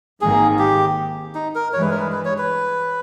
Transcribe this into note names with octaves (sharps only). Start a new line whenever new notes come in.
G#1 G#2 D#3 A#3 G#4
G4
D#4
A#4
G2 E3 G#3 C#5
B4
A#4
B4
B4
C#5
B4